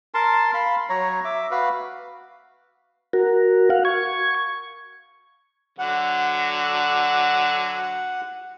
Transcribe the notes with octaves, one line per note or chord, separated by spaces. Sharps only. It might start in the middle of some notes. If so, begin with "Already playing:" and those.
A#4 A5 C6
F5 B5 C6
F#3 C#5 A#5
E5 D6
F#4 B4 F5
F#4 A#4
F5 F#5
C#6 G#6
D3 F#3 F#5